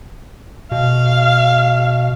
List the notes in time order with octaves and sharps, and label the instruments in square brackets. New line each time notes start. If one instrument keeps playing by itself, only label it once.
[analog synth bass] B2 [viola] F5